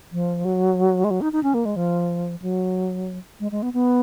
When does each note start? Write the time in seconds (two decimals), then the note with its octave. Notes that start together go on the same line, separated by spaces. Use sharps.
0.12 F3
0.45 F#3
1.04 G#3
1.11 F#3
1.21 D#4
1.33 D#4
1.43 C#4
1.54 A#3
1.65 G#3
1.76 F3
2.42 F#3
3.40 G#3
3.52 G#3
3.62 B3
3.73 B3